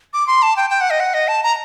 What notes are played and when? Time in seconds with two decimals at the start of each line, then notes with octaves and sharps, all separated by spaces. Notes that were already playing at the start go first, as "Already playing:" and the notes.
0.13 D6
0.27 C6
0.42 A5
0.56 G5
0.70 G5
0.81 F#5
0.90 D#5
1.00 F#5
1.14 D#5
1.28 A5
1.43 A#5